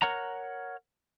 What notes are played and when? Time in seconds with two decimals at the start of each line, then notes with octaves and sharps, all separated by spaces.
0.02 A#4 C#5 F#5 A#5